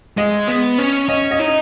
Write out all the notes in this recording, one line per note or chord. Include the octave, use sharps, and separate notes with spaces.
G#3 D#5
B3
C#4
C#4 D#5
D#5
D#4